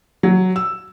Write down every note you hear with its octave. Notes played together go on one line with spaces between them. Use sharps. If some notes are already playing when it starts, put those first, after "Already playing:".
F#3
E6